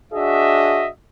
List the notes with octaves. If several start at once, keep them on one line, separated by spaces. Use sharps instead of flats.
D4 F#4 G#4 D#5 E5